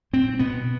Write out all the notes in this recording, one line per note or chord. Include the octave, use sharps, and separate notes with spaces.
A#2 C4
B2 B3